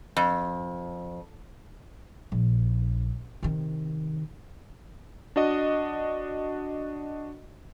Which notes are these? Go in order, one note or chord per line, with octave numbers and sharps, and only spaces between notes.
F2
A#1
C3 D#3
D4 F#4 D#5